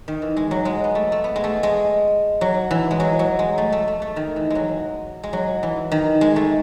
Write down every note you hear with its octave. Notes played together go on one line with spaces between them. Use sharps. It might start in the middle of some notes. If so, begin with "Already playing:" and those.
D#3
E3
G#3
F#3
G#3
B3
A3
A3
B3
G#3
A3
G#3
F#3
E3
G#3
F#3
F#3
G#3
A3
A3
A3
A3
D#3
E3
F#3 G#3
G#3
F#3
E3
D#3
G#3
A3